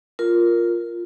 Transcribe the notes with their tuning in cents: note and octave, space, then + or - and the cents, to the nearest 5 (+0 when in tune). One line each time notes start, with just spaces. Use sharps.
F4 +0 A#4 +0